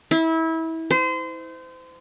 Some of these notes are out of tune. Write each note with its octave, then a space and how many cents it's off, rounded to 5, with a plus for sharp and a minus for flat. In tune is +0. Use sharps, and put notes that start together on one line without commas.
E4 -25
C5 -30